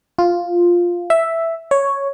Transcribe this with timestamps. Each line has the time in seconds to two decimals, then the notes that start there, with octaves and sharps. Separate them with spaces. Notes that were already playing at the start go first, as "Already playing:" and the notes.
0.18 F4
1.10 E5
1.71 C#5